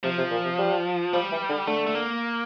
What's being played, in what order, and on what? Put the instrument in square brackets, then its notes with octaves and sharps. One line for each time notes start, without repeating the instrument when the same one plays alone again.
[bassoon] C3 [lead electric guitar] F3
[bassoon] C3
A#2
C3
G3
[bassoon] F3 [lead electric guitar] G3
[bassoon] E3
D3
[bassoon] D3 [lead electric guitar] A3
[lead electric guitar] A3
A#3